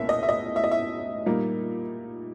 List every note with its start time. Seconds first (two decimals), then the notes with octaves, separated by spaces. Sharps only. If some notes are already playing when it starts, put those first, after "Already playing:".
Already playing: C#2 B2 A#3 C#4 E5
0.09 D#5
0.23 E5
0.29 D#5
0.56 E5
0.64 D#5
0.71 E5
1.26 A#2 G3 A#3 D#4